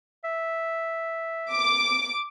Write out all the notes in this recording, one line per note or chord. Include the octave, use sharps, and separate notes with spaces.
E5
D6